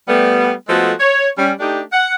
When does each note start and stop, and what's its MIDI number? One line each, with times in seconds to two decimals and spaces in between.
0.08 0.52 55
0.08 0.52 57
0.08 0.52 59
0.68 0.92 53
0.68 0.92 56
0.68 0.92 57
0.68 0.92 59
0.68 0.92 66
0.68 0.92 69
1.00 1.28 73
1.38 1.52 55
1.38 1.52 61
1.60 1.81 57
1.60 1.81 62
1.60 1.81 63
1.60 1.81 67
1.92 2.14 78